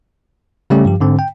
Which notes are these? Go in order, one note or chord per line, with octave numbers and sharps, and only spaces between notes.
C#3 G3 A3 C#4 G4
G2 F3 G4
G#2 D3 C4
G5